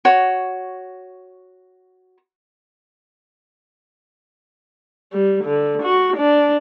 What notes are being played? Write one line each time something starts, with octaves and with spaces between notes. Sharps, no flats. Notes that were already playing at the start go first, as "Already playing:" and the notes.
F#4 C#5
G3
D3
F#4
D4